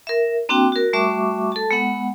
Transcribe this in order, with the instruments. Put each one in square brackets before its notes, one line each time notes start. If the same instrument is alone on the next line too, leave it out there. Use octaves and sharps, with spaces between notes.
[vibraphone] A#4 E5
A#3 C4 D4 F#4 G5
F#4 A#4
G3 A3 F#4 E5 C#6 D6
A4 A5
G#3 B3 F#5